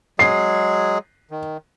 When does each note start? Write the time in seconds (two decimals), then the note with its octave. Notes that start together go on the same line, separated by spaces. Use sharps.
0.19 F#3 G#3 G#4 C7
1.31 D#3